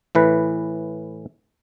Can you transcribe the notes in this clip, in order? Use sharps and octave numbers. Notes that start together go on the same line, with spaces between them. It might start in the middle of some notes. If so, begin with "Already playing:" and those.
A2 E3 B4